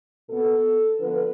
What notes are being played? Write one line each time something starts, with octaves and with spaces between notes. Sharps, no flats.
B2 B3 A4
D3 F3 B3 B4